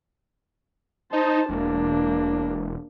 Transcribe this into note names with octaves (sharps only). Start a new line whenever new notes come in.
D#4 C5 A5
E1 A#3 D4